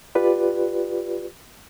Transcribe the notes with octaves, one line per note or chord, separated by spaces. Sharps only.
F4 G4 B4 D5